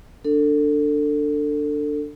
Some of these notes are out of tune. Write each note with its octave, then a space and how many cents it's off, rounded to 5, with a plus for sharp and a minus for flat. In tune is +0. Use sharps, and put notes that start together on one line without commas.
D4 +0 A4 +25